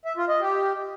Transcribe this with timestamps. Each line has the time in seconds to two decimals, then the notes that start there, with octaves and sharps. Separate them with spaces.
0.05 E5
0.17 F4
0.29 D#5
0.41 G4